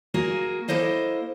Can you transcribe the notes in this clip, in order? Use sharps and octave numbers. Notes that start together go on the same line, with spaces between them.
A#3 F#4 G#4
A#3 E4 A4 C5 D#5 F5